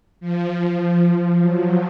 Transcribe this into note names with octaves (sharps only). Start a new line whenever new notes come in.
F3
F#3